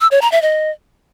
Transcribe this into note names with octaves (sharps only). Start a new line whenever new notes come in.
E6
C#5
A#5
E5
D#5